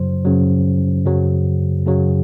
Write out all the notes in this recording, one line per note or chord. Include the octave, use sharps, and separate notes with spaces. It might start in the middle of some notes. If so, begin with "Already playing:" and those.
Already playing: F#2 C#3 F#3 C5
F#2 C#3 F#3
F#2 C#3 F#3
F#2 C#3 F#3